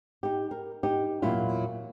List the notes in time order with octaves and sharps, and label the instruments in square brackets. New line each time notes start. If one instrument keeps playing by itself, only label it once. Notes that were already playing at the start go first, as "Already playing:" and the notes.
[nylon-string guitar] D#4 G4
A#4
D#4 G4
E2 A#2 F#3 E4 F4